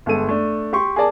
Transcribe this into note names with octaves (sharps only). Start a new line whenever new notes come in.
G1 G#3 A4 D#7
A3 D4
G4 C6 C#6
G#4 A#4 D5 A5